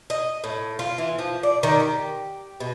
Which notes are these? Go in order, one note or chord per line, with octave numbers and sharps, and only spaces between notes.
D#5
A2
F4
E3
F3
D5
D#3
G4
B2